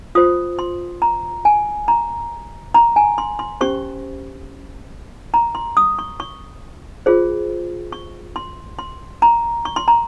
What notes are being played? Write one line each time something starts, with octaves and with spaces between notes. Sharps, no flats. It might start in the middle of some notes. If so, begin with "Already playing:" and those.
F4 C5 D#6
C6
A#5
G#5
A#5
A#5
G#5
C6
C6
C#4 G4 C5 C#6
A#5
C6
D#6
C#6
C#6
F4 G#4 C5
C#6
C6
C6
A#5
C#6
C6
A#5